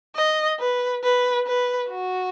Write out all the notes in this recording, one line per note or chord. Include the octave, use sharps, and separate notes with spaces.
D#5
B4
B4
B4
F#4